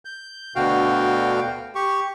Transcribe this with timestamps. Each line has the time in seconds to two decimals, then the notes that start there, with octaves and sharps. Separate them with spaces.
0.05 G6
0.56 D2 B2 D3 F#4 F5 G5
1.75 G4 C#6